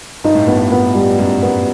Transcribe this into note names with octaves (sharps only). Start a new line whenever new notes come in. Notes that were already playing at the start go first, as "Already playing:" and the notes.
G2 D#4
A2
G2 B3
B3
G3
F#2 G3
B3